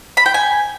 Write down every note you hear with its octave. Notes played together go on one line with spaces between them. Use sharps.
B5
G5
G#5